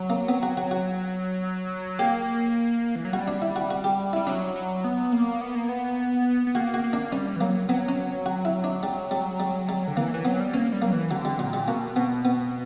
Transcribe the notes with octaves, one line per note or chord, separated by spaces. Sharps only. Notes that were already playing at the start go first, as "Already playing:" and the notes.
Already playing: F#3
A#3
B3
F#4
F#4
F#4
A#3 G4
E3
F#3
G3 F#4
D4
E4
F#4
F#4
G4
G3 E4
F#3 D4
F#3
B3
A#3
B3
A#3
B3
B3
A#3 F#4
F#4
A#3
D4
G3 C#4
E3
F#3 A#3
F#3 B3
C#4
F#4
E4
D4
G3
G3
G3
G3
D3
E3 A#3
E3
F#3 B3
G3
A#3 C#4
G3
F#3 A#3
E3
D3 F#3
G3
A#2 F#3
G3
B2 A#3
B2 B3
B3